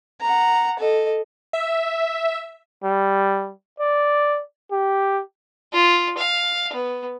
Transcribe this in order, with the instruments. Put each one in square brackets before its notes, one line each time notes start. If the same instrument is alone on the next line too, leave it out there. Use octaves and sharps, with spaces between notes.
[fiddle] F#5 A#5
A4 D#5
[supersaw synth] E5
[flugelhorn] G3
D5
G4
[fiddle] F4
F5
B3